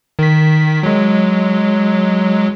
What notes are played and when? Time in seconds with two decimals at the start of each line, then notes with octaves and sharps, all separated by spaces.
0.19 D#3 B6
0.83 F#3 G#3